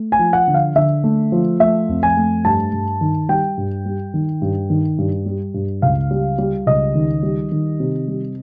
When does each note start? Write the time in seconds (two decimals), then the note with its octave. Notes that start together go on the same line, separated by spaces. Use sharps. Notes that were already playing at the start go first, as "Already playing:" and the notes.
Already playing: A3
0.12 G#5
0.19 F3
0.33 F#5
0.47 D3
0.54 F5
0.75 D3 E5
1.04 A3
1.32 F3
1.60 A3 E5
1.89 F2
2.03 G#5
2.17 A3
2.45 G2 A5
2.73 G2
3.01 D#3
3.29 G3 G5
3.57 G2
3.85 G3
4.14 D#3
4.42 G2
4.70 D#3
4.98 G2
5.26 G3
5.54 G2
5.82 C#2 F5
6.11 G3
6.38 G3
6.67 C#2 D#5
6.95 D#3
7.23 G3
7.52 D#3
7.80 C3
8.08 G3